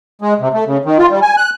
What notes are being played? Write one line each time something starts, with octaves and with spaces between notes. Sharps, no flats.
G#3
C3
A3
C#3
D#3
F4
G3
G#5
F#6